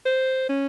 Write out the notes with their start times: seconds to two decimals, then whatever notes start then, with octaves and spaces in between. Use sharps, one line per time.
0.05 C5
0.49 C#4